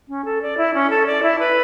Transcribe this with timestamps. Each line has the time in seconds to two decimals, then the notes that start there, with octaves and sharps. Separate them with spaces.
0.09 C#4
0.25 A4
0.42 D5
0.57 E4
0.74 C#4
0.90 A4
1.06 D5
1.23 E4
1.39 B4